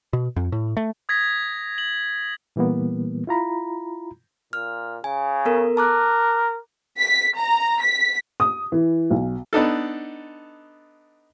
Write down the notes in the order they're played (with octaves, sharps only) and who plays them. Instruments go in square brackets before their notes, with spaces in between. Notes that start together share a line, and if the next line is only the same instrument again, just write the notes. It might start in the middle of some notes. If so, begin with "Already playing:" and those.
[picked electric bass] B2
F2
A2
A3
[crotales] D#6 G#6 A#6 B6
F#7
[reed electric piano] A#2 E3 G3 A#3 B3
E4 F4 A#5 B5
[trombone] A#2 [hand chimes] F6
[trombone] C#3 [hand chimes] G#5
[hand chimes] B3 A4 A#4
[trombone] A#4 [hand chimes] A5 D6 F#6
[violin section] B6
A#5
B6
[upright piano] D#6
E3
B1
[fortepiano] B3 D4 D#4 A4